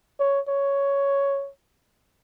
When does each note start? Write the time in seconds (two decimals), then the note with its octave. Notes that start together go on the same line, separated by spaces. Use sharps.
0.20 C#5
0.48 C#5